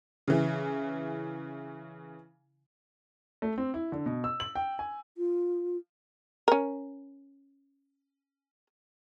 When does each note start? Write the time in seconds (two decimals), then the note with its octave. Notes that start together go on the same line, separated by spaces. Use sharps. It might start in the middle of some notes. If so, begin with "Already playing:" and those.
0.28 C#3 E3
3.42 A3
3.58 C4
3.74 E4
3.92 D3
4.06 B2
4.24 E6
4.40 F#7
4.55 G5
4.79 G#5
5.18 F4
6.48 C#4 A#4